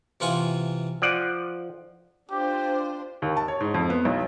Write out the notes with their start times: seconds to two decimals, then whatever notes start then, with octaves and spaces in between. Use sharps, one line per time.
0.20 C3 E3 F4 F#5 G#5 C#6
1.02 F3 D5 F#5
2.31 D4 F4 G4 C5
3.22 D#2
3.37 A5
3.48 C#5
3.60 G#2
3.74 F2
3.90 B3
4.05 B1